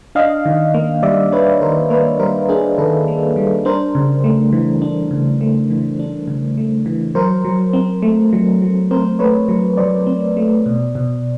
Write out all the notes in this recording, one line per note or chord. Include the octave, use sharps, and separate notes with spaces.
D4 D#5 F5
D#3
A#3
G3 D5 E5
D4 B4 C#5
D#3 A#4 C5
A#3 B4 C#5
G3 A#4 C5
D4 G#4 A#4
D#3 A4 B4
A#3
G3
D4 A#4 C5
C#3
A3
E3
D4
C#3
A3
E3
D4
C#3
A3
E3
F#3 A#4 C5
F#3
C4
A3
F#3
F#3
C4 A#4 C5
A3 B4 C#5
F#3
F#3 C5 D5
C4
A3
B2
B2